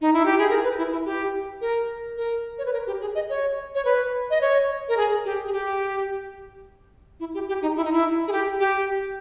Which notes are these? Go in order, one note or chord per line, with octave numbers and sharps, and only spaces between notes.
D#4
E4
G4
G#4
A#4
B4
E4
E4
G4
A#4
A#4
C#5
B4
A#4
G4
G#4
D#5
C#5
C#5
B4
D#5
C#5
A#4
G#4
G4
G#4
G4
E4
G4
G4
D#4
E4
D#4
E4
G#4
G4
G4